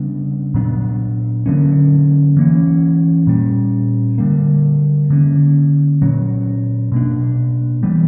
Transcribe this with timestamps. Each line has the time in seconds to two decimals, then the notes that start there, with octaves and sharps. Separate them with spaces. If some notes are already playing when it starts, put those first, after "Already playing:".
Already playing: C#3 G3 B3 D4
0.54 A#2 F#3 B3 D4
1.46 D3 F#3 A#3 C#4
2.37 E3 A#3 C#4
3.27 A#2 G3 C#4
4.18 D3 G3 A#3
5.10 D3 A#3 C#4
6.02 A#2 F#3 C#4
6.92 B2 A#3 D4
7.83 E3 G3 B3